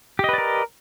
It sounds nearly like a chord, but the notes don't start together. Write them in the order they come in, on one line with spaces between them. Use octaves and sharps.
G4 D#5 B4 D5 A#4